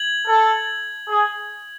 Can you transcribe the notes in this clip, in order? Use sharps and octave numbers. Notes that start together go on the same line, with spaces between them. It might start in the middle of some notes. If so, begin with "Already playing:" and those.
Already playing: G#6 F#7
A4
G#4